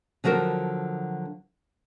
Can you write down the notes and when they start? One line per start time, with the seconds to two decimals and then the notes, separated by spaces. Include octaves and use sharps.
0.24 D3 F3 F#3 F#4 A#4